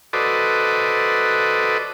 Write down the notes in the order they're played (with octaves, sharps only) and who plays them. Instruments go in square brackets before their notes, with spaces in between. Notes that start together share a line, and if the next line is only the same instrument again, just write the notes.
[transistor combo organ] F#4 A4 B4 C5 D5 D#5